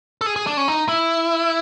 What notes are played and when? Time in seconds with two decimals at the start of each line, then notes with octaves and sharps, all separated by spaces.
0.21 A4
0.26 G#4
0.36 G#4
0.47 D4
0.57 C#4
0.68 D#4
0.89 E4